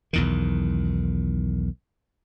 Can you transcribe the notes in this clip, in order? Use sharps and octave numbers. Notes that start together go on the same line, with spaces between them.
B1 E2 D#3